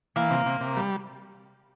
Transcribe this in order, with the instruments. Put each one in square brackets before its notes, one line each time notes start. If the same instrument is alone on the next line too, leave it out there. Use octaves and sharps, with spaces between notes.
[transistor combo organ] E3 [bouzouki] A#3
[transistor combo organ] C3
C3
C3
G3